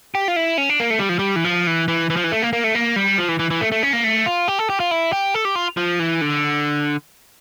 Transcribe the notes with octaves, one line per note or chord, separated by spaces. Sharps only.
G4
F4
E4
C#4
D4
A#3
A3
G3
F3
G3
E3
F3
E3
E3
E3
F3
E3
A3
A#3
A#3
A3
A#3
G3
F3
E3
E3
E3
A3
A3
C#4
A#3
A3
F4
G4
A4
G4
F4
E4
G4
A4
G4
F4
F3
E3
D3